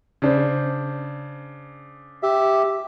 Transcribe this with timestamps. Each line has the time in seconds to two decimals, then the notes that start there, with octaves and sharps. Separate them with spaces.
0.22 C#3 D4 C5
2.23 G4 E5